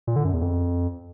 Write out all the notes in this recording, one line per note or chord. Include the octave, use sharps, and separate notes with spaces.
A#2
D3
F#2
E2
F2